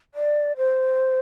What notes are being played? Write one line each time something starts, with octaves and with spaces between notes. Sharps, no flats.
D5
C5